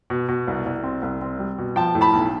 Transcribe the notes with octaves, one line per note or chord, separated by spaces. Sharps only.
B2
B2
C2
C2
C4
C2
C4
G3
B2
F3 G5 A5
A2
A5 B5
B1